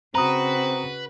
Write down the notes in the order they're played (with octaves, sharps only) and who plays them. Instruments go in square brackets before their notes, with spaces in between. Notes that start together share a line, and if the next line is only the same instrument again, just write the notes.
[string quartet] C#3 F#4 [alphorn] C4 [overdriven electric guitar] B4 [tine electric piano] A#5 D#6